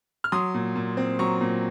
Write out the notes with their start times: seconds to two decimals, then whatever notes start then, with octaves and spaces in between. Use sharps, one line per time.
0.24 F6
0.32 F#3 C6 D#6
0.54 A#2
0.76 A#2
0.97 C4
1.19 F#3 A#5 C#6
1.41 A#2